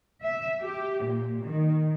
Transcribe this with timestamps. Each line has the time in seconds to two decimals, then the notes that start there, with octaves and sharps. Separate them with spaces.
0.23 E5
0.61 G4
1.04 A#2
1.45 D#3